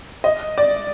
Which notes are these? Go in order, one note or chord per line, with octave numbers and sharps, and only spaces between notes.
D#5
D5